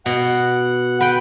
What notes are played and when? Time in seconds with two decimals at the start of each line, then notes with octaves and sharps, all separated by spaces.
0.06 B2 F#5
1.01 B4 F#5 G5